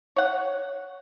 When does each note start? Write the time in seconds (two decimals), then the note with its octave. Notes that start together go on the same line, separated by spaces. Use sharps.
0.16 C#5 F#5